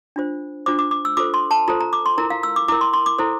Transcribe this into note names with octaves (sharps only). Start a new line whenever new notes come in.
D4 F4 C5
D4 F4 C5 D6
D6
D6
E6
F4 A4 C5 D6
C6
A5
F4 A4 C5 A#5
A#5
D6
C6
E4 A#4 A#5
F5
E6
D6
E4 A#4 D6
C6
C6
D6
E4 A4 C5